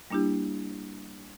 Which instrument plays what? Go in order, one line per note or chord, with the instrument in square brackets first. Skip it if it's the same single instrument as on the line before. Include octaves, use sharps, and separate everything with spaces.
[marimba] G3 A#3 D4 E4 G4